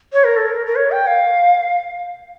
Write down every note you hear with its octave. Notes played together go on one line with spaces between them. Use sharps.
C#5
A#4
A4
A#4
A#4
C#5
G5
F5